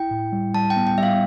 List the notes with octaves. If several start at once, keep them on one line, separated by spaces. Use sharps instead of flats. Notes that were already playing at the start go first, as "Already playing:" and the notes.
Already playing: E4 G5
A2
G3
G3 A5
G5
B3
G5
G3 E5
F5